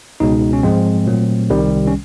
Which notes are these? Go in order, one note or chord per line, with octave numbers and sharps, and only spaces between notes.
C#2 B2 G#3 D#4
C#4
G#2 F3 G#3 C4
A#2 F#3 A3
C2 C3 D#3 G3
C#4